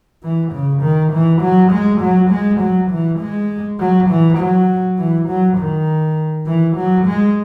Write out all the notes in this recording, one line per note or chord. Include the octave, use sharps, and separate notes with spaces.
E3
C#3
D#3
E3
F#3
G#3
F#3
G#3
F#3
E3
G#3
F#3
E3
F#3
E3
F#3
D#3
E3
F#3
G#3